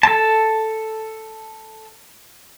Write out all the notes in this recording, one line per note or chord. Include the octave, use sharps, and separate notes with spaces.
A4 A5